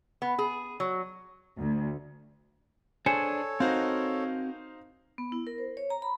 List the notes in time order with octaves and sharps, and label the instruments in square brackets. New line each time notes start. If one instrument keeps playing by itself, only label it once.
[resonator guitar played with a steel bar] B3
G#4
F#3
[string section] D2
[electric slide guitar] D4 G#4 C5 [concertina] A4 C#5 [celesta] G#5 C#7 E7
[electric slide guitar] C4 F#4 A#4 [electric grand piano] D#4 C5 F5
[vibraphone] B3
E4
A#4
C5
C#5
A#5
B5